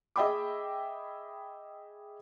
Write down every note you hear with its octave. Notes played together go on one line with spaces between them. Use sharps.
G#4 D#5 E5 G5 B5 D6